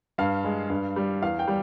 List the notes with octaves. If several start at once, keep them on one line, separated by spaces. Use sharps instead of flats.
G2 F5
G#3
G2
G3
E2 F5
G5
G3